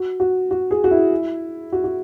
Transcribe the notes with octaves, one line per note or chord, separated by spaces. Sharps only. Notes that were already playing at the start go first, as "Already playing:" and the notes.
Already playing: F#4
F#4
F#4
G#4
F#4
E4
F#4
F#4